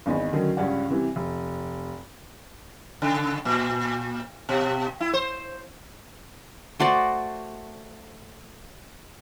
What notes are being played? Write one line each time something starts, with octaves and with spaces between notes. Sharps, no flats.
G#1 E2 D#4 B5
D3 D#3 F#3 C#4
C#2 G2 C#4 D5 F#5
C3 E3 G3
F1
C#3
A#2
B2
E4
C5
A3 F#4 C5 D5